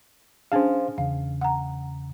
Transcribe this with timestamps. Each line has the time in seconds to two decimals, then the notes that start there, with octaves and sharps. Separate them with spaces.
0.52 C#4 D4 G#4 C5 F5
0.98 E2 C#3 F5
1.41 F#5 A#5